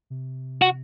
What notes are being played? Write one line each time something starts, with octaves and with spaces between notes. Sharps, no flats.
C3
F#4